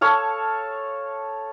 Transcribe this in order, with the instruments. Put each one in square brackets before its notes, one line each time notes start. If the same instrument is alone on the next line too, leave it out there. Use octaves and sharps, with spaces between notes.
[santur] A4 C#5 F5 A5